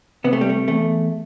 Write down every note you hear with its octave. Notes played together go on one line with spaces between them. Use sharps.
C3 B3
A3
G3
A3
E2 A3